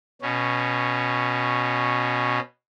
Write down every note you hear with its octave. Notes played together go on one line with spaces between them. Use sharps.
B2 C#4